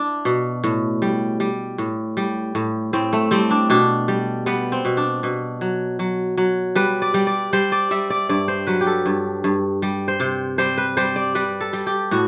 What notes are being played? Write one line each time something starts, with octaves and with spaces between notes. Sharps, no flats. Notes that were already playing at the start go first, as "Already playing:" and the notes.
Already playing: D4 E4
B2
A2
G3
G3
A2
G3
A2
A2 C4
A3
G3 C4
D4
B2 D4
G3
G3 B3
C4
B2
D4
B2
F#3
F#3
F#3
G3 B4
D5
G3
D5
G3 C5
D5
G3 E5
D5
G2 D5
C5
F#3 B4
G4
A4
G2
G2
G3
C5
C3
G3 C5
B4
G3 C5
D5
G3 B4
A4
G3
G4
A2 F#4